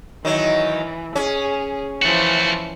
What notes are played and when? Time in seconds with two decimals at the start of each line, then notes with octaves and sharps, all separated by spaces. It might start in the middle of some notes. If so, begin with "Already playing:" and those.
0.25 D#3 E3 F#3
1.16 C#4 G#4
2.02 E3 F3 A3 F#4